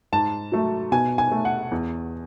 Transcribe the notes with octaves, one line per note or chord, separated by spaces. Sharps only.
G#2 A5
F#3 A3
B2 G#5
G#5
A3
F#5
E2